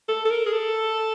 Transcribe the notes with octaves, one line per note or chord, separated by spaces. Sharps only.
A4
A4
A#4
G#4
A4